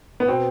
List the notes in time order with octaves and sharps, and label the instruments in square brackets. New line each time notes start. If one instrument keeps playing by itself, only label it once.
[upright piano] B3
B2 C4